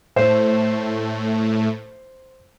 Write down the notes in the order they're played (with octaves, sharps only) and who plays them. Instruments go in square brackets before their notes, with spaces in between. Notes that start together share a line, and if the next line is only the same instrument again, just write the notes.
[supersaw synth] A2 A3 [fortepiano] C5